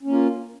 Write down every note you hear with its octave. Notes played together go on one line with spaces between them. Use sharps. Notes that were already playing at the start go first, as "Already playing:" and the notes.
A#3 C#4 F4